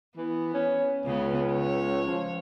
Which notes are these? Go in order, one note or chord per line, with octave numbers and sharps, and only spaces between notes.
E3 B3
C#4
C#2 C#3 B3
C#5
F3